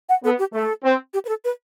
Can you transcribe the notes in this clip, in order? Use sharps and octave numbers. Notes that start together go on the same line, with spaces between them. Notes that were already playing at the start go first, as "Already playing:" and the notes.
F#5
B3 A4
G4
A3 A4
C4
G4
B4
A4
B4